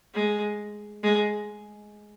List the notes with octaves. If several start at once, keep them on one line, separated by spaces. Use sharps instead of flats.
G#3
G#3